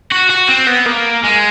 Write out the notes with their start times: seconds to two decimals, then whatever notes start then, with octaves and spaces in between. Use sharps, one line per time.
0.12 F#4
0.30 F#4
0.49 C4
0.67 B3
0.86 A#3
1.23 G#3